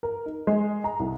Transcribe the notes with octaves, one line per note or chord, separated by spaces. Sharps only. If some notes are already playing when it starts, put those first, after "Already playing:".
A#4
D#4
G#3
A#5
C2